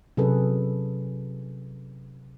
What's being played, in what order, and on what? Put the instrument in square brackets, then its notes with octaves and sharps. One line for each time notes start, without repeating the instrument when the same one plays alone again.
[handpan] C3 F#3 C#4 G#4 A4 B4